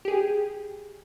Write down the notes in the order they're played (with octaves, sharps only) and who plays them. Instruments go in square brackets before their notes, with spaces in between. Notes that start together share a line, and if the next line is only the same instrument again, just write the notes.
[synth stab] G4 G#4